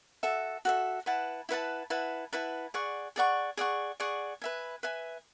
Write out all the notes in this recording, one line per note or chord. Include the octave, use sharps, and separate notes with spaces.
F#4 A4 E5
F#4 A4 E5
E4 B4 F#5 A5
E4 B4 F#5 A5
E4 B4 F#5 A5
E4 B4 F#5 A5
G#4 D5 F#5 C#6
G#4 D5 F#5 C#6
G#4 D5 F#5 C#6
G#4 D5 F#5 C#6
B4 E5 G#5
B4 E5 G#5